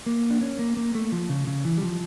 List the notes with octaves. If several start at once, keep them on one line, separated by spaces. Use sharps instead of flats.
A#3
D4
C#4
A#3
A#3
A3
F3
C#3
C#3
E3
G3
F3